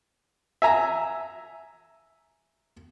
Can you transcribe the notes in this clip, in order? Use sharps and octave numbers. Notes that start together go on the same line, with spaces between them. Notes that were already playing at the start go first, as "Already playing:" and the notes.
E5 G#5 A#5